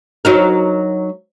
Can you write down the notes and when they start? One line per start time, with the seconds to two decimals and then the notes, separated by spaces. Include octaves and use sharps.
0.25 F#3 D#4 A#4